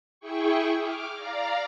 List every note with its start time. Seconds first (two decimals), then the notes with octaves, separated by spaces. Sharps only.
0.20 E4 G#4 G5 C#6
0.79 D6 F6
1.14 D5 F5 A#5